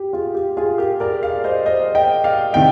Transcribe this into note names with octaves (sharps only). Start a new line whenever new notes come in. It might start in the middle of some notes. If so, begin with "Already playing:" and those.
Already playing: G4
F4 G#4
G4
F4 G#4
G4 A#4
A#4 D5
D5 F5
C5 D#5
C5 D#5
D#5 G5
D5 F5
C3 D#3 D#5 G5